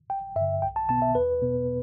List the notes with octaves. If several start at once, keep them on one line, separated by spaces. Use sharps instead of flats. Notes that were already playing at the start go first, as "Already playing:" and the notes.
G1 G5
G2 D3 E5
B1 G5
A5
B2 B3 A5
E5
E2 B4
B2 B3